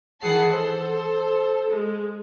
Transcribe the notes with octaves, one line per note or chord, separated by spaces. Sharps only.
D#3 E3 G#4 F#5 A5 C7
A4 C5
G#3